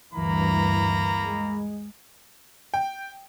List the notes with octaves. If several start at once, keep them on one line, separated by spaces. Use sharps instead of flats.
D2 G2 E3 A#3 A#5 B5
G#3
G5